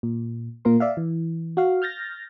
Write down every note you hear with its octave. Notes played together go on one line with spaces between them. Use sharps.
A#2
A#2 A#3 A#4 C6
D5 E5 F5
E3
F#4 F5
F6 G6 A6 A#6